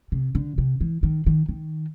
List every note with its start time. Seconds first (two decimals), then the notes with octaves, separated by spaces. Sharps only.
0.12 C3
0.35 D3
0.58 C3
0.81 E3
1.03 D#3
1.26 D#3
1.49 D#3